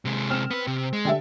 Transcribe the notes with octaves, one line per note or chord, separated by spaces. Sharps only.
C3 G#3
C4 F6 E7
B3 B4
C3
G#3
D3 G4 E5